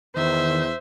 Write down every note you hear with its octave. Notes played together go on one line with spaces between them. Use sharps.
E2 D#3 C5 E5